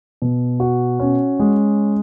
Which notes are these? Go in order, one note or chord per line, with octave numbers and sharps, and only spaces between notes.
B2
F#4
C#4
G#3